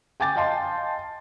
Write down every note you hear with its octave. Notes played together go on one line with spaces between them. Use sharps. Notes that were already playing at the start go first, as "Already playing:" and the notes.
G5 G#5 D6 A6
D#5 F5 G5 A5 C6